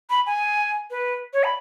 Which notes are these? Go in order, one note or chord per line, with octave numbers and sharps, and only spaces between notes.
B5
G#5
B4
C#5
B5